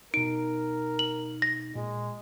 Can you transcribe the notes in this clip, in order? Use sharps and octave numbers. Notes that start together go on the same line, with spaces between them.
B2 D#4 A#4 D7
F#7
A#6
A#2 G#3